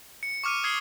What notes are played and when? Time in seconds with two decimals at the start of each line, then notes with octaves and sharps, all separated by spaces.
0.23 C#7
0.44 C#6 D6 F6 C#7 D#7
0.64 D#6 G#6 C7 G7